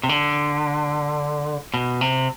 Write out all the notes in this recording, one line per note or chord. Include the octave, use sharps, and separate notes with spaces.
C3
D3
B2
C3